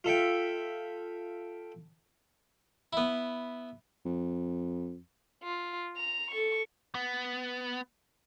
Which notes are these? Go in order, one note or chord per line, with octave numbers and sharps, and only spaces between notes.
F4 A4 E5 G5
B3 E4
F2
F4
A#5 F7
A4 C#6
B3